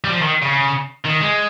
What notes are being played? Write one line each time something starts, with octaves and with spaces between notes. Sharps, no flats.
G3
F3
D#3
C#3
D#3
G#3